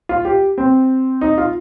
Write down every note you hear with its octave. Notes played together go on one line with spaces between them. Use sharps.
F4
G4
C4
D#4
F4